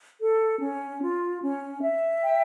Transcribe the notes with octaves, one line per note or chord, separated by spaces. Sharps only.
A4
C#4
F4
C#4
E5
G5